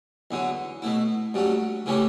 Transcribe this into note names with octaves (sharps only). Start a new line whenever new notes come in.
E2 D3 F#3
B2 A3 E4
G2 F#3 A3 C#4
C#3 E3 A3 C#4 G4